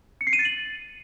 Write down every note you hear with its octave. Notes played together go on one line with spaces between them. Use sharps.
C#7
C7
D#7
A6
F#7